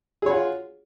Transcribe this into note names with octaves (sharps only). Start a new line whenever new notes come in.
F4 F#4 G#4 C#5